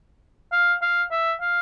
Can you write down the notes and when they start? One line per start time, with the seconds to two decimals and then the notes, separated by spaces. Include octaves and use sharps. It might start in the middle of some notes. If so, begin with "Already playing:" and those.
0.52 F5
0.82 F5
1.11 E5
1.41 F5